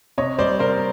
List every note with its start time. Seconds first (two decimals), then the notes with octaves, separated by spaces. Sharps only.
0.18 C3 C#5 D#5
0.39 G3 C5 D5
0.59 C3 A#4 C5